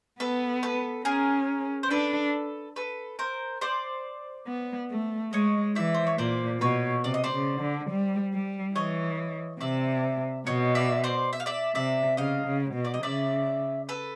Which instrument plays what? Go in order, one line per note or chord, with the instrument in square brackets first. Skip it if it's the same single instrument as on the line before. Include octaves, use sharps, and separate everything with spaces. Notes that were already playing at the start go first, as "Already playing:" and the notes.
[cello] B3 [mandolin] A4 B4
[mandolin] A4 B4
[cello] C#4 [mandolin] G#4 A#4
[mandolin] C5
[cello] D4 [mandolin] A4 B4
[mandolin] A4 B4
A#4 C5
C5 D5
[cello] B3
A3
[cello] G#3 [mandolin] C#5 D#5
[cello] E3 [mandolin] D5 E5
[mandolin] C5
C#5
[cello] A#2 [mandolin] C5 D5
[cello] B2 [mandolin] B4 C#5
[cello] C3 [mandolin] D5
[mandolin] D#5
C5 D5
[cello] C#3
D3
G3
G3
[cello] E3 [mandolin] C#5 D#5
[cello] C3 [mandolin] D5 E5
[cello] B2 [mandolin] C#5 D#5
[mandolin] D5 E5
C5 D5
E5
F5
D5 E5
[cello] C3 [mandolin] D5 E5
[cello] C#3 [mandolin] D#5 F5
[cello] C#3
B2
[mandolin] D5
D#5
[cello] C#3 [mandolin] D5 E5
[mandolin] A4 B4